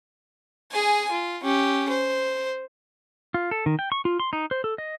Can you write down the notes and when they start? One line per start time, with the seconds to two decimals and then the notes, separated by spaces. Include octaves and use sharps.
0.72 G#4 G#5
1.11 F4
1.43 C#4 G4
1.89 C5
3.34 F4
3.51 A4
3.66 D#3
3.79 G5
3.92 C#6
4.05 F4
4.20 C6
4.33 D#4
4.51 C5
4.64 A4
4.78 D#5